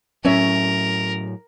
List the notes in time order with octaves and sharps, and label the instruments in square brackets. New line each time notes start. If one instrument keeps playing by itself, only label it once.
[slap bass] A2 F#3 [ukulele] C#4 C#5 E5 [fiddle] A#4